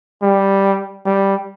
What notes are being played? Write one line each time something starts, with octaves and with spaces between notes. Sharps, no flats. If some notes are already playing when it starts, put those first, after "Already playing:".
G3
G3